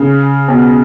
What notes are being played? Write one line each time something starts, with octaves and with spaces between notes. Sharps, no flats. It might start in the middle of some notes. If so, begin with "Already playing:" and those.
Already playing: C#3
B2